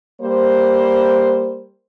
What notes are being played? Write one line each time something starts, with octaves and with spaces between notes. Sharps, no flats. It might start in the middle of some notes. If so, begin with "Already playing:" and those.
G3 A#3 C5